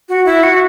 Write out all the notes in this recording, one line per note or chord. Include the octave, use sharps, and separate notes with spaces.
F#4
E4
F#4